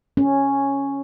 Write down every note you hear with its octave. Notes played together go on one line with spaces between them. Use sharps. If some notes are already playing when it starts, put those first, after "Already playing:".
C#4